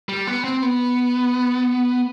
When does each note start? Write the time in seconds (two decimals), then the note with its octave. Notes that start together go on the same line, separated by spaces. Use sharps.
0.09 G3
0.27 B3
0.44 C4
0.62 B3